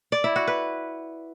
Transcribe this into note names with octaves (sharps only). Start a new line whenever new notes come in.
D5
E4
F#4
B4